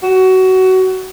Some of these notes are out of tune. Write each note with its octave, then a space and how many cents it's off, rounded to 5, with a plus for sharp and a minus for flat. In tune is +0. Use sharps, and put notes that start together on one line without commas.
F#4 +20